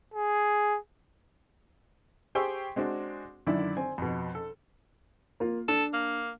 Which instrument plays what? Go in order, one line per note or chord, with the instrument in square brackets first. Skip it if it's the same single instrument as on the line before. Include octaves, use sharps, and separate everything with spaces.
[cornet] G#4
[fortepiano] G4 G#4 C5 G5 C#6 E6
G#3 C4 D4 F#4
F#2 D3 D#3 E4 D5 B5
C4 G#5
F2 B2
A4
[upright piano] A#3 F4
[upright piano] D4 [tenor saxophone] A4
[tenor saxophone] A#3